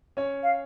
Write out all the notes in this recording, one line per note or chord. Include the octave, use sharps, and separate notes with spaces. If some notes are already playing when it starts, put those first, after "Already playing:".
C#4 C#5
F5